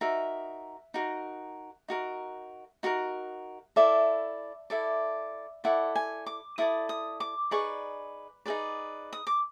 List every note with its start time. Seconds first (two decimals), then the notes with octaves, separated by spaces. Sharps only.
0.01 D#4 F#4 A#4 E5
0.94 D#4 F#4 A#4
1.88 D#4 F#4 A#4
2.83 D#4 F#4 A#4
3.76 E4 A4 D5 E5
4.70 E4 A4 D5
5.64 E4 A4 D5 F#5
5.96 G#5
6.26 D6
6.58 E4 A4 D5 D#6
6.89 D#6
7.20 D6
7.51 D#4 G#4 B4 D5 C#6
8.46 D#4 G#4 B4 D5
9.13 D#6
9.27 D6